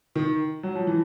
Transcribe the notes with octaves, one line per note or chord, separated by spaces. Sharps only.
D#3
F#3
F3
E3